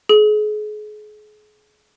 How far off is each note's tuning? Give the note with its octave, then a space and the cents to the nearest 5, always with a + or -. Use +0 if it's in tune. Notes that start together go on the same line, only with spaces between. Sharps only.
G#4 +35